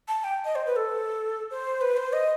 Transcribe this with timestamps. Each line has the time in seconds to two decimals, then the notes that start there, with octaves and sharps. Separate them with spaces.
0.08 A5
0.24 G5
0.45 D#5
0.55 C5
0.66 B4
0.76 A4
1.51 C5
1.81 B4
1.97 C5
2.13 D#5